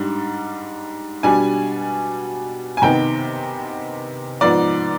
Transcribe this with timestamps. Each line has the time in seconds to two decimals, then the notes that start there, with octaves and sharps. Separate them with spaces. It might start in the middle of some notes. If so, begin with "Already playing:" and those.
Already playing: G#2 G3 D4
1.23 B2 G3 D4 G#5
2.77 G#5
2.82 C3 D#3 B3 G5
4.41 G#2 F3 B3 D5